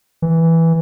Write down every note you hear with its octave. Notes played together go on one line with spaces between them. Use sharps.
E3